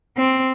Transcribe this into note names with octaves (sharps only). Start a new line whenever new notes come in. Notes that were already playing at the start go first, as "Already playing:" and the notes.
C4